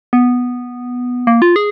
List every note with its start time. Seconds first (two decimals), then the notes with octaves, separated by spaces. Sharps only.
0.13 B3
1.27 A#3
1.42 F4
1.56 G#4